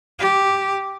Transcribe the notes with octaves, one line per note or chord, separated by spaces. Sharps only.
G4